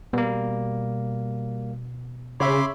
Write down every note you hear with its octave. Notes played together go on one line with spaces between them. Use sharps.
B2 G3 A#3
C#3 C#5 E5 B5 C6 D6